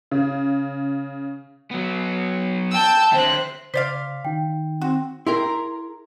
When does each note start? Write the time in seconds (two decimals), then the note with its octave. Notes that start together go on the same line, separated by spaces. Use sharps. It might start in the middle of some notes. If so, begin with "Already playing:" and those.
0.11 C#3
1.71 F#3 B3
2.71 G5 A5 E6 G6
3.13 D3 C4 C5 E5 F#6
3.74 C#3 C5 D5 F5 B6
4.25 D#3 D#4 G5
4.82 C4 F#4
5.27 E4 G#4 A#4 G5 A#5 C6